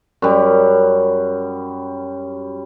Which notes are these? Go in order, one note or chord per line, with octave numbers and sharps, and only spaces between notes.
F#2 G3